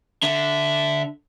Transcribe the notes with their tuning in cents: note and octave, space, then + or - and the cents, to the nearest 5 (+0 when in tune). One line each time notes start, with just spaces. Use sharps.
D3 -5 E5 +0